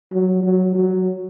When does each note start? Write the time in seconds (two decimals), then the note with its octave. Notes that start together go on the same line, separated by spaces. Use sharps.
0.12 F#3
0.43 F#3
0.75 F#3